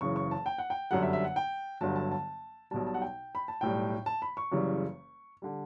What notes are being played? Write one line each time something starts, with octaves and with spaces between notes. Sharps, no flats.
F#1 F#2 C#3 E3 C#6
C#6
A5
G5
F#5
G5
G1 F#2 D3 G3 F#5
E5
E5
F#5
G5
G1 G2 D3 F#3 A5
A5
A5
B1 B2 G3 A5
A5
F#5
G5
B5
A5
B1 A2 G3 G5
A5
B5
C#6
F#1 F#2 C#3 E3 G3
D3 G3